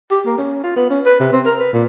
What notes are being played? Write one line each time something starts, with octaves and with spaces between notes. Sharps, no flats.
G4
A#3
C#4
F4
B3
C#4
B4
C3
C4
A#4
B4
A#2